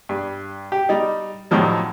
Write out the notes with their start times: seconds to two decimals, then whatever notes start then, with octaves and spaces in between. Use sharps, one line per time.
0.09 G2
0.72 G4
0.89 G3 D#4
1.51 F#2 A2 D#3 F3 G3